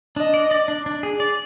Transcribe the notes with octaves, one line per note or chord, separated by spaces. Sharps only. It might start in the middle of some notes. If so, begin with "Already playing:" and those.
D4 D#5
D5
D5
D4
D4
G#4
D5